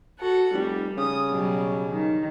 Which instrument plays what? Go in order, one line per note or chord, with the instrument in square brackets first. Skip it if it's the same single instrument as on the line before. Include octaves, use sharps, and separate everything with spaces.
[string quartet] F#4 A4 F#5
[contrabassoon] F1 [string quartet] G3
[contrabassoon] C#3 [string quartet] D#6
[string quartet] B2 F#3 G3
D#3